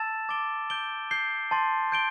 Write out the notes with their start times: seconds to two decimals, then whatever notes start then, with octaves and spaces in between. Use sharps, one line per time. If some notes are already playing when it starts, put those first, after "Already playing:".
Already playing: A5 E6 A6 E7
0.29 D6 A6 D7 G7
0.70 G6 D7 G7
1.11 G6 C7 G7
1.51 A5 C6 A6
1.92 G6 D7 G7